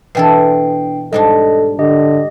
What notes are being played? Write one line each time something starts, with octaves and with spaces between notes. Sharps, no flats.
B2 E3 D4 A4 G5 C7
G#2 G3 D4 A4 D#5
D3 G4 D#5